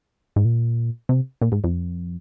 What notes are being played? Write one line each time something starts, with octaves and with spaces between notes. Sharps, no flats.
G#2
A#2
C3
A#2
G#2
F2